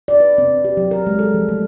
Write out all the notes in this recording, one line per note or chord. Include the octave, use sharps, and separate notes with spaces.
D5
B4
C4
C4
G4
F#3
A#4
G#3
A4
F3
A3